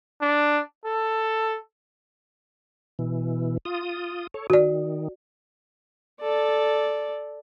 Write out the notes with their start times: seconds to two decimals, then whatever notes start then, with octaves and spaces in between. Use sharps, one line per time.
0.21 D4
0.85 A4
2.99 B2 E3
3.65 F4 D#6
4.34 A4 C#5
4.50 D#3 F#4 D5
6.21 A4 D5